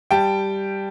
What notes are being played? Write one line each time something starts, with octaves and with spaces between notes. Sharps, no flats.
G3 G5 A5